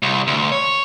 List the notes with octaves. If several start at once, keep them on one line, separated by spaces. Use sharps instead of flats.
C2
D2
C#5